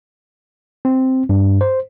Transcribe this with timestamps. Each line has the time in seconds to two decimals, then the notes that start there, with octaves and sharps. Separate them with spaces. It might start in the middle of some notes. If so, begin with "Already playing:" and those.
0.85 C4
1.29 G2
1.61 C5